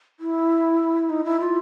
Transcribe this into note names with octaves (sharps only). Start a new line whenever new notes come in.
E4
D#4
E4
F4